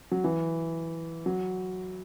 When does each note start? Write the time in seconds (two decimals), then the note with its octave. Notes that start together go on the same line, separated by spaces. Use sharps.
0.12 F#3
0.24 E3
1.26 F#3